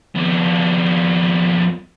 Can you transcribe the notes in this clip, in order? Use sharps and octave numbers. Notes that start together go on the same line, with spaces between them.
F2 B3